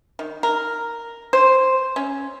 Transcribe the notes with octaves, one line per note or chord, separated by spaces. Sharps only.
D#3
A#4
C5
C#4